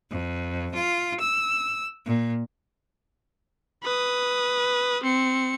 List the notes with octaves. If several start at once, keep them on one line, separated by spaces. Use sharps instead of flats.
F2
F4
E6
A#2
B4 D#6
C4 C#7